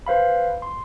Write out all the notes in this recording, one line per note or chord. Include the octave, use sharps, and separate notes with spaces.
B4 C5 F5 B5
C6